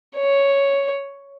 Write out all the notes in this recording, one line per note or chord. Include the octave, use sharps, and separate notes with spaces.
C#5